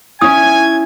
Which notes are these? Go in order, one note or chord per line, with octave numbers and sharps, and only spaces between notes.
C#4 E4 G#5 D#6 G#6